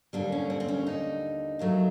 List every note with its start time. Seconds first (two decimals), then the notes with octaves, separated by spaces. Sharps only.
0.13 D#2 D3 G3 D4
0.32 C#4
0.50 C4
0.60 C4
0.68 C#4
0.87 D#4
1.59 D#2 D#3 F#3 A3